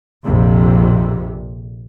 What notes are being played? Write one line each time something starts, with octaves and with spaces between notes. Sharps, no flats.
A#1 F2 C3